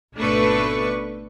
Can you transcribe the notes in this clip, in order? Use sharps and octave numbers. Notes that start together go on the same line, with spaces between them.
G#1 B2 A3 D4 B4 C#6